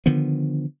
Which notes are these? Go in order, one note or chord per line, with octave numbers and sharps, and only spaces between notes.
D3 D#3 F3 B3